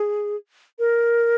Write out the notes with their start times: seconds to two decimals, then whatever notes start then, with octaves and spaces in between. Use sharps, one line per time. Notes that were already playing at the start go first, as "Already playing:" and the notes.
Already playing: G#4
0.79 A#4